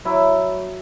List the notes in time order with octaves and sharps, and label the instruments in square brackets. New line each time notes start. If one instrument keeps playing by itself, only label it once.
[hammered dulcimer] F#3 E4